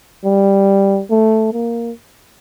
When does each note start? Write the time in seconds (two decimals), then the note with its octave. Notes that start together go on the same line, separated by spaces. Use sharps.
0.24 G3
1.10 A3
1.53 A#3